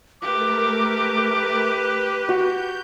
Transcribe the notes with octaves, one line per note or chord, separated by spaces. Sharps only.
A3 G4 A#4 B4 D6
F#4 G6